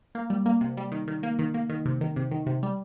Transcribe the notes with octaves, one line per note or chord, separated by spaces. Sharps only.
A#3
G3
A#3
C3
G3
D#3
D#3
A#3
D#3
A#3
D#3
C3
D#3
C3
D#3
C3
G3